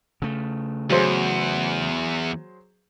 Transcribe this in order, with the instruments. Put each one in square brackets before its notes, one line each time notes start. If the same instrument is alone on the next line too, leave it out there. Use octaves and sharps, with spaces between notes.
[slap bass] C#3 A3
[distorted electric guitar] E2 [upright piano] F#3 G#4 C5